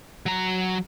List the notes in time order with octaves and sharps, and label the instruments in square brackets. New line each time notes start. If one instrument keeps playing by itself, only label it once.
[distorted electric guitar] F#3 A#5